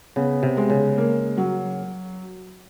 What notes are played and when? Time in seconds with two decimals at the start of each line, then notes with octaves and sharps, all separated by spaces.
0.16 C#3 B3
0.43 C3
0.57 G#3
0.70 C#3
0.98 A#3
1.37 F#3